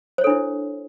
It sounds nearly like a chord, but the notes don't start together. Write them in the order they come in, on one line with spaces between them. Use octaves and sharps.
C5 C#5 A4 D4 E4